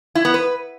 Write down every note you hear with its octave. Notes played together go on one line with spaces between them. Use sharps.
E4
B3
B4